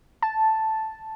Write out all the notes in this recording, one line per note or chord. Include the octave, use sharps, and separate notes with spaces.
A5